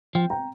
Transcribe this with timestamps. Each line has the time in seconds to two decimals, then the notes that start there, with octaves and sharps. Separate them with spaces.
0.15 F3 G5
0.30 G5 A#5